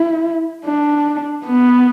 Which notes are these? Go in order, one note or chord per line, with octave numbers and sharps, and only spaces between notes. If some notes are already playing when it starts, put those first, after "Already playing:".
Already playing: E4
D4
B3